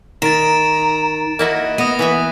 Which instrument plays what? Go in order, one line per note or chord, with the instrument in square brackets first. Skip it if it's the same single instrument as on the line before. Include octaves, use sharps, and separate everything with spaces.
[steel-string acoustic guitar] D#3 [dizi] A#5 [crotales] A6 D7 E7
[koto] A#3 E4 F#4 [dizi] D#5
[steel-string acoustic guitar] B3 [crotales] D#6 A#6 D#7
[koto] E3 B4 E5